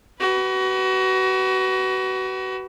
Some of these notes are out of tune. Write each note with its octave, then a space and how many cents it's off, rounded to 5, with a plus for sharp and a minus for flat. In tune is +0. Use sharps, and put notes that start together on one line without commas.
F#4 +30 B4 +0